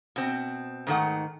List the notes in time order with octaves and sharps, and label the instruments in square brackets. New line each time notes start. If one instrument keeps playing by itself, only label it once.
[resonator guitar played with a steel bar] B2 C4
G#2 D#3 A3 F#5